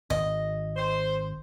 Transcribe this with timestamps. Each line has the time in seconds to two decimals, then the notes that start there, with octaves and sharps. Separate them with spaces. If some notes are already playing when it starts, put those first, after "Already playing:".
0.10 G#1 D#5
0.76 C5